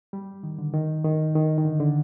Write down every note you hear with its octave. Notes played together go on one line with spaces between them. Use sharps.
G3
D#3
D3
D#3
D#3
D#3
D#3
D3
D3